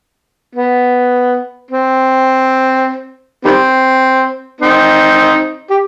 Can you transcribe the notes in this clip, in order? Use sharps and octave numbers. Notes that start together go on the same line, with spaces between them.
B3
C4
D#3 G3 C4
C4 D#4
G4